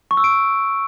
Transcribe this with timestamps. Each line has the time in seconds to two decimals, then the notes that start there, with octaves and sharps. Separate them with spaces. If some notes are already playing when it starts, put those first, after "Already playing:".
0.11 C#6
0.17 E6
0.24 D7